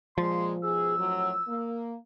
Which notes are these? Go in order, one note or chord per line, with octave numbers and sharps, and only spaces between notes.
A#2 F3 G#3 C6
G#2 B2 G#4 E6
F#2 A2 F#3
A#3